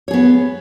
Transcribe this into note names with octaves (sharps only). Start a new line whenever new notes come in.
B3 G#4 C#5